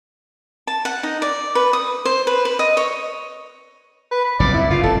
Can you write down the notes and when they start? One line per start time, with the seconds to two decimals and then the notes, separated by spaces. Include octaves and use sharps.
0.67 A5
0.85 F#5
1.03 D#4
1.22 D5
1.55 B4
1.73 D#6
2.05 C5
2.27 B4
2.45 B4
2.59 D#5
2.77 C#5
4.11 B4
4.24 B5
4.40 F#1 C2 A#2 D5
4.54 E4
4.70 G2 C#3 F4
4.83 F1 A4